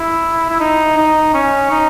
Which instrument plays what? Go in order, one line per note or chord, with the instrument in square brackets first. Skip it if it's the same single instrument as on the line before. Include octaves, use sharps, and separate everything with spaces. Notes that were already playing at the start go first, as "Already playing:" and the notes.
Already playing: [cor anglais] E4
E4
D#4
D#4
C#4
D#4